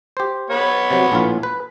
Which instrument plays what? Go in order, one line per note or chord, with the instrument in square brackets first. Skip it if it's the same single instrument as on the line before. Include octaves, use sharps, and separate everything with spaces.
[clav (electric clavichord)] G4 C5
[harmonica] B3 B4 C#5
[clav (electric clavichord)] C3 F#3
A#1 A2 F4
B4